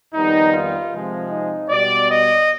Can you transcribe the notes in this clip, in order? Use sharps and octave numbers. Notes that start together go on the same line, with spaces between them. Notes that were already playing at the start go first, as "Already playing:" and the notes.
F2 D#3 G3 B3 D#4
F4
C3 F3 G#3 C4
D#4
B2 G3 B3 D5
D#5